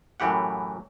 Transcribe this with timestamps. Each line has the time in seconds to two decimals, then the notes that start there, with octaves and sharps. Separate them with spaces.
0.20 F#2 A2 E3 G4 F#5